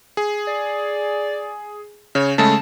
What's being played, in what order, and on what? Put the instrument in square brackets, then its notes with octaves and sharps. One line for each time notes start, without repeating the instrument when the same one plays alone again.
[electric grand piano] G#4
[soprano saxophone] D5
[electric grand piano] C#3 [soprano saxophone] C#5
[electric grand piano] C#3 G#3 A3 [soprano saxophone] A5